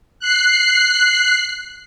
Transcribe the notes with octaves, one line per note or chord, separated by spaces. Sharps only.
F#6 C7